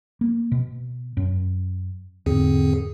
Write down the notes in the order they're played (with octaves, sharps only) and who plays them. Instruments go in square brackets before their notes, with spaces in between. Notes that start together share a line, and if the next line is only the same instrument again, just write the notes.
[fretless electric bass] A#3
B2
F#2
[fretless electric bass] E2 G#2 [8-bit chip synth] D3 C4 G#4